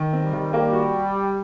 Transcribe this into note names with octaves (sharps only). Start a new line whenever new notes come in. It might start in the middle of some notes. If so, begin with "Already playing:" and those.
Already playing: D#3
C4
G3
D#3
G3 A#3
F#4